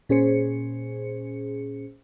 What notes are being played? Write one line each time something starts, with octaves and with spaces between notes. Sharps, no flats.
A#2 C#4 G#4 C5 C#7